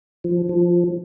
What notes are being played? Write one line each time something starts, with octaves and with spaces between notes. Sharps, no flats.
F3
F3